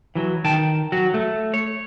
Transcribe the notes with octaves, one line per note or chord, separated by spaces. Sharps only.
E3 F#3
D#3 G5 A5
F#3 F#4
A3
C#5